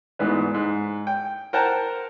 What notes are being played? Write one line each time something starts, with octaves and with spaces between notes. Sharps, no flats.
D2 G#2 E3 B3
G#2
G5
A#4 C5 F#5 G5 A5 A#5